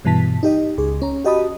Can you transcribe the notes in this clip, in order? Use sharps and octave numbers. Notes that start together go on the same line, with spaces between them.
G2 B2 E3 A5 B6
D#4 G4 D#5
C#2 G#4
C#4 A#5
F#4 G4 D#5 A5 B5 D#6